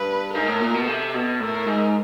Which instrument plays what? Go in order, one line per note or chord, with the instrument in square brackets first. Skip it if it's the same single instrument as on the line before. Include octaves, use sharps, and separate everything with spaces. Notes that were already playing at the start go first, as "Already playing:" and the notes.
Already playing: [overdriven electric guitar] G2 [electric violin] B4
[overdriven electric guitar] G#2 [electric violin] A#4
[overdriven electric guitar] A2
A#2
B2
[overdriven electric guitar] C3 [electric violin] A4
[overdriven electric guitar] B2
[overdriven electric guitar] A2 [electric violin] A#4
[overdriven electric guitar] G#2